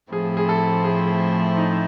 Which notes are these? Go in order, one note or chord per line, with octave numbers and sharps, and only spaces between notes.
A2 F3 A3 C4 E4 G#4
G#4
A4
G#4
D#4